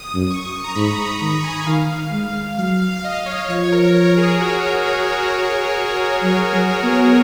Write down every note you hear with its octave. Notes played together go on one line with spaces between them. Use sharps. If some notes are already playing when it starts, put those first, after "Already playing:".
Already playing: D#6
F#2
C#6
A#5
G#2 B5
B5
D#3 A#5
A#5
G#5
D#3 F5
G#3
F#3 F5
F5
F5
D#5
C#5
F3 C#5
A#4
A#4
G#4
F#4
G#4
G#4
F#4
F#3
F#3
B3